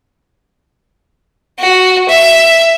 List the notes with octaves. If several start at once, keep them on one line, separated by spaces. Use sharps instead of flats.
F#4
E5